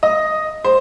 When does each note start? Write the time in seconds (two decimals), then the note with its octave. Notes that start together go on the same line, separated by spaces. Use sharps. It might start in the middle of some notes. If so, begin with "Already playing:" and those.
0.03 D#5
0.64 C5